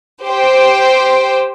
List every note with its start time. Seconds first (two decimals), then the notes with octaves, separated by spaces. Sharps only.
0.25 G4 C5 G5